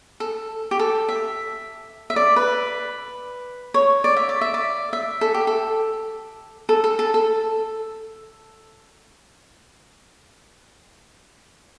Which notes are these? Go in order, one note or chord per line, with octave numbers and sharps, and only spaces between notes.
A4
G4
A4
E5
E5
D5
B4
C#5
D5
E5
D5
E5
D5
E5
A4
G4
A4
A4
A4
A4
A4